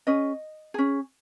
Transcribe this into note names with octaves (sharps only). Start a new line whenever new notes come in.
C#4 G#4 D#5
C#4 G#4